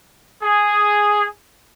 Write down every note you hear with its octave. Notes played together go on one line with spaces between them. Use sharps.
G#4